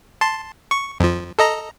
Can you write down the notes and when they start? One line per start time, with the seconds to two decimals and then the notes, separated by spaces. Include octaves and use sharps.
0.21 A5 C6
0.71 C#6
1.00 F2 F3
1.39 A4 D#5 A#5